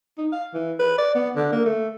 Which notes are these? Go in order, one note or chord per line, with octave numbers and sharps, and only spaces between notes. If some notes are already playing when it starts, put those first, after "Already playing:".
D#4
F5
E3
B4
D5
B3
D3
A#3
A3